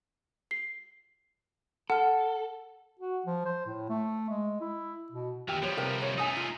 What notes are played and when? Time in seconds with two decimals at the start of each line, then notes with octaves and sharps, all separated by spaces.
0.51 C7
1.90 A4 F#5 F6
2.99 F#4
3.26 F3
3.45 C5
3.66 A2
3.90 A3
4.29 G#3
4.61 E4
5.12 B2
5.48 D#2 E3 G4 G5 F6
5.62 F3 G3 B4 C#5
5.77 C3 A#4 B4 G5
6.01 B4 C#5
6.18 A3 C#4 D#4 G#5 D#6
6.37 F4